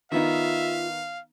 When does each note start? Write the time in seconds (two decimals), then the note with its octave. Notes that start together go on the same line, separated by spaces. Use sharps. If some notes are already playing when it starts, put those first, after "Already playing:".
0.12 D#3 B3 D#4 F4 E5 F5